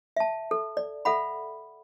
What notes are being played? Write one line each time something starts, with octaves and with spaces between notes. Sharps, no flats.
E5 A5
A4
D5
A4 E5 F#5 B5